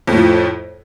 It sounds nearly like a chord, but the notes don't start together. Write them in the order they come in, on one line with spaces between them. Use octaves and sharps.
F2 A2 F3